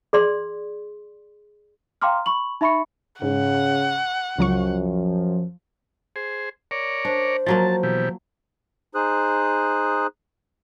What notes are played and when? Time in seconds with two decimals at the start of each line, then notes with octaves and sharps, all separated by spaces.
0.13 G#4 D5 C6
2.02 F5 G5 A#5 C6 D6 F6
2.26 B5 C#6 F#7
2.61 D#4 E5 B5 C#6 C#7
3.22 G#2 C#3 F#5
4.38 C#2 F#2 F3 F#3 C#6
6.16 G#4 C5
6.71 A#4 C#5 D5
7.05 D4 C5
7.46 F3 F#3 A#3 A5
7.83 B2 E3 G4
8.95 D#4 G#4 C5 D#6 F#6